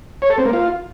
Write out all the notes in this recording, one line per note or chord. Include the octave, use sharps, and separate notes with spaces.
C#5
A4
C4
A#3
F4